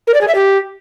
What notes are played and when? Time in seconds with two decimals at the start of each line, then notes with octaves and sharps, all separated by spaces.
0.07 A#4
0.14 D5
0.21 G#4
0.28 E5
0.35 G4